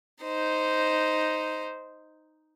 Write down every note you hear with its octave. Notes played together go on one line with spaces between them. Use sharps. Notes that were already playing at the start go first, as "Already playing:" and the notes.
D#4 C5